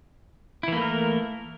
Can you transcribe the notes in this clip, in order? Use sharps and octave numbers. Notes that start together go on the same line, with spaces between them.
E3 A3 A#3 E4 A#4